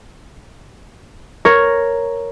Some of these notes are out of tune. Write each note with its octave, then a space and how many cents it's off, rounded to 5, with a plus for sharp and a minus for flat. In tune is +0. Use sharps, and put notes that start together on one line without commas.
A#4 +0 C#5 +0